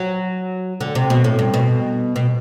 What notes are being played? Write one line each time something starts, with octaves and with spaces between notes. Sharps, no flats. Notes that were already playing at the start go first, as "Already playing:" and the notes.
Already playing: F#3
D3
C3
B2
A2
G2
B2
B2